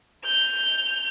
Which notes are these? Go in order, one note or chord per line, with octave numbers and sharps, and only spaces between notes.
G6 F7